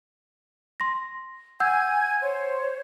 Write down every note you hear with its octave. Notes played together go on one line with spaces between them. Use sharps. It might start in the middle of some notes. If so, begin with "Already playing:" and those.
C6 A#6
F#5 G#5 E6 G6 G#6
C5 C#5